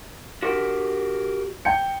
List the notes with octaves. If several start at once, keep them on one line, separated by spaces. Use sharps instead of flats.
F#4 G4 A#4
G5 G6 C#7